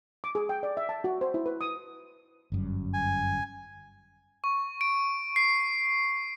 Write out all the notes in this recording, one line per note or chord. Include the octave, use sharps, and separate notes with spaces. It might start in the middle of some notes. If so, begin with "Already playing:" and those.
D6
G#4
G5
D5
E5
A5
F#4
C5
E4
B4
D#6
G1 F#2 G3
G#5
C#6
D7
C7